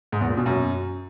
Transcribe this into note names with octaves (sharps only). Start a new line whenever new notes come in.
G#2
E2
A#2
B2
F#2